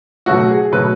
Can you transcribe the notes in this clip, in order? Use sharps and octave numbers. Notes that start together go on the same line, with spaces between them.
B2 F#3 A3 F#4
G#4
B2 F#3 A3 B4